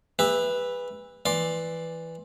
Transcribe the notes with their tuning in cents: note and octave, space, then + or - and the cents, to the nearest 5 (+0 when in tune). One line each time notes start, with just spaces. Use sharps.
G#4 -45 B4 +0 E5 +0
E3 +0 D5 +0 C6 +10